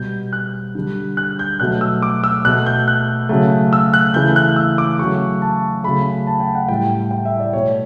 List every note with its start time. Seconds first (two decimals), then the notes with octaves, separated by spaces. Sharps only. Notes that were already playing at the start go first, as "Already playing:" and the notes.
Already playing: B2 G3 G6
0.33 F#6
0.75 D3 G3
1.17 F#6
1.39 G6
1.60 B2 F#3 A3 F#6
1.81 E6
2.02 D6
2.24 E6
2.45 B2 A3 F#6
2.66 G6
2.88 F#6
3.29 C#3 F#3 A3
3.73 E6
3.94 F#6
4.14 C#3 E3 A3 G6
4.36 F#6
4.56 E6
4.78 D6
4.99 C#3 F#3 A3 C#6
5.42 A5
5.84 C#3 F#3 A3 B5
6.27 A5
6.40 G5
6.55 F#5
6.69 A2 G3 G5
7.11 G5
7.25 E5
7.40 D5
7.53 B2 A3 C#5